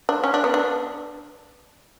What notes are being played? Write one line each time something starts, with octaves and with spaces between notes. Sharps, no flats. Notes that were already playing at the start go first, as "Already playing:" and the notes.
D4
C#4
D4
B3
D4